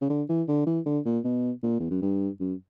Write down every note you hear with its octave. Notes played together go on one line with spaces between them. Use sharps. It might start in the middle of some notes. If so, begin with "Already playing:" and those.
C#3
D3
E3
D3
E3
D3
A#2
B2
A#2
E2
F#2
G2
F#2